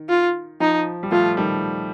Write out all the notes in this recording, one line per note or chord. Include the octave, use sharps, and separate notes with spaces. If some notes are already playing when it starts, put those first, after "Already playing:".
Already playing: D#3
F4
F3 D#4
G3
F3 A3 F4
D#3 G3